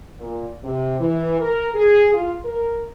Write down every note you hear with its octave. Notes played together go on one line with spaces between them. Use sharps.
A#2
C3
E3
A#4
G#4
F4
A#4